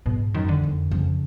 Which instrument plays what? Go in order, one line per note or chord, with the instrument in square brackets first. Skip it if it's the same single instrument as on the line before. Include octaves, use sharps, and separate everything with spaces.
[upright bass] G#2 [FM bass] B2
[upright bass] F#2 [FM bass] D#3
[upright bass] F2 [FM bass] D3
[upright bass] F2
[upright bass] F2 [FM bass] C#3